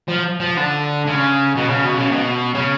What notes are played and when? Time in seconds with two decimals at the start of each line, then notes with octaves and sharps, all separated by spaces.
0.08 F3
0.40 F3
0.57 D3
1.07 C#3
1.56 B2
1.69 C#3
1.84 B2
1.97 C#3
2.11 B2
2.54 C#3